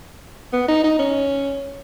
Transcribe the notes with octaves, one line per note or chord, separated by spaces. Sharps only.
B3
D#4
D#4
C#4